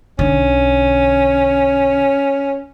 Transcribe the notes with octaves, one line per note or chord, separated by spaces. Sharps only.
B1 D3 C#4